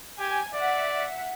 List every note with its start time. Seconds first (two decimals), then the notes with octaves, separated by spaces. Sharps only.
0.20 G4 G#5 G#6
0.54 D5 E5 F#5